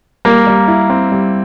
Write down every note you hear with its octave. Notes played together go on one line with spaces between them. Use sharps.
G3 A#3
G3
E4
C4
G3